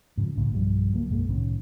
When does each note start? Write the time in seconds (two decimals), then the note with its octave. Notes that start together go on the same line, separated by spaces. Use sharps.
0.17 G#2 C#3 F3
0.36 C#2 A2 D3
0.53 B1 G2 F3 G3
0.93 C#2 F#3 A#3
1.09 B1 F#2 G#3 A#3
1.29 C2 A2 D#3 C#4